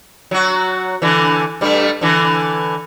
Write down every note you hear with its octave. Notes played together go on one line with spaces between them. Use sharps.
F#3 F#4
D3 E3
G2 G3 A3
D3 E3